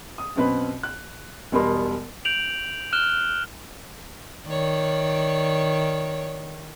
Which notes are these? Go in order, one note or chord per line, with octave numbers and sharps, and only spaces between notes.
D#6
F#2 B2 C4 B4
F#6
E1 B2 G3 B3 A#4 C6
G6 D7 F7 F#7
F6 F#6 E7 G7
D#3 C#5 D5